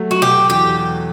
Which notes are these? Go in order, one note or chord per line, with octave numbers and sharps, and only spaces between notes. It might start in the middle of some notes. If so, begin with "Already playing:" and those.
Already playing: F#3 A3
F#4
B2 G4
E2 G4